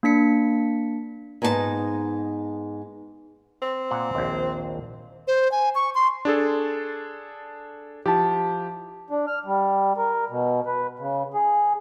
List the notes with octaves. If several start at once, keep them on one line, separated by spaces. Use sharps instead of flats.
A#3 D4 B6 C#7
G#2 B3 D#4 F#4 A5
C4
A#2 F#5
A#1 D#2
C5
G#5
C#6
C6
D4 G#4 A4
F3 E4 G4 A5
D4
F6
G3
A#4
B2
B4
C#3
G#4